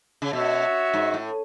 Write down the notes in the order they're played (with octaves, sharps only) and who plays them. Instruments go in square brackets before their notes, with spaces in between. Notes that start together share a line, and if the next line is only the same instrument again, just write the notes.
[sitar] C#3
[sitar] B2 [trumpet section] F#4 C#5 E5
[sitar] G#2
A2